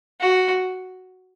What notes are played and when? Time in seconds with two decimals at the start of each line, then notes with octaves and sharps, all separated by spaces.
0.21 F#4